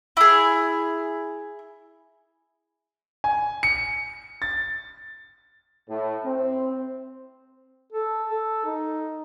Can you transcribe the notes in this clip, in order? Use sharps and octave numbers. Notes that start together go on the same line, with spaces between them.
E4 G#4
G#5
C#7
A6
A2
C4
A4
A4
D#4